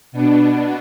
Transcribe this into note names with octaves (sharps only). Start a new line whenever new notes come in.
B2 B3 D4